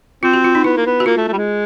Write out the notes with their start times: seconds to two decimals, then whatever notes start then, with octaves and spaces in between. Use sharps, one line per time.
0.23 C4 F4
0.34 F#4
0.44 F4
0.55 D#4
0.64 B3 E4
0.77 A#3
0.86 B3
1.00 F#4
1.06 A#3 F4
1.17 A3
1.28 A3
1.33 G3
1.38 G#3